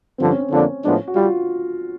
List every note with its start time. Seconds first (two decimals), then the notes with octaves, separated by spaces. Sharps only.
0.18 G2 D3 F3 C4
0.29 C#4
0.40 C#4
0.51 F2 D3 F3 A#3 D4
0.83 A2 F3 G#3 B3 D4
1.08 F#4
1.15 G3 F4